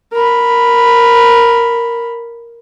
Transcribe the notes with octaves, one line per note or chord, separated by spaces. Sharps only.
A#4 B5